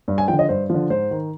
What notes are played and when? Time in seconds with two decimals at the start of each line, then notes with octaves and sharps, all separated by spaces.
0.08 G2
0.18 G#5
0.28 D3 F3 G5
0.39 D#5
0.49 G2 C5
0.70 D3 F3
0.90 G#2 C5
1.11 D#3